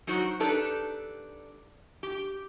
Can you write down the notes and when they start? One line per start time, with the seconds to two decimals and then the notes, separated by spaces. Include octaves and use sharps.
0.07 F#3 D#4 F#4 C5
0.40 D4 D#4 G4 A4 B4 D5
2.03 G4